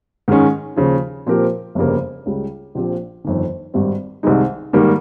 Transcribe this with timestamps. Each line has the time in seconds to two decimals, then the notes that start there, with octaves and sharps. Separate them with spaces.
0.28 G#2 D#3 G#3 C#4
0.76 D#2 C#3 F3
1.26 A#2 F3 C4 G4 A#4
1.75 G1 F2 C#3 G3 A#3
2.26 C#2 C#3 G3
2.75 A#1 A#2 F3 C4 G4
3.24 G1 F2 D#3
3.74 G#1 G2 G3 C4
4.23 C2 C3 D#3 G#3 D#4
4.73 G#2 D#3 G3 A#3